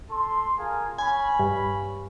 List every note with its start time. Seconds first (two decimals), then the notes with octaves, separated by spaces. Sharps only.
0.11 A4 C6
0.58 F4 G#4 A#4
0.98 C#4 G#5 B5
1.39 G2